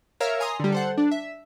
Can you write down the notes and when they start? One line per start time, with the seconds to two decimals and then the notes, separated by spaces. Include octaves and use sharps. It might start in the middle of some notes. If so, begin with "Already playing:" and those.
0.20 A#4 C#5 E5 F5 A#5 F6
0.40 G#5 A#5 C6 D#6
0.60 D3 G3
0.72 A4 C5 F#5
0.97 D4
1.11 E5